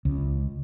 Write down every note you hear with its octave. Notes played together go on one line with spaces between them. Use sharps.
C#2